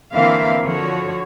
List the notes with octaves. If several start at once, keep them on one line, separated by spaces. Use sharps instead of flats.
D3 E3 A#3 C4 E5 F5
D3 F3 F#4 C#5